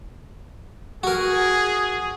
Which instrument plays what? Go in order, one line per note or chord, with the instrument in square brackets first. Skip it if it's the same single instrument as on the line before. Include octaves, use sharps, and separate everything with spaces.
[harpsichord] F#4 A#4 [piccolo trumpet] G#4